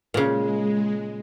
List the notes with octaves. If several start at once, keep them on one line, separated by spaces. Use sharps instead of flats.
A#2 C#3 G#3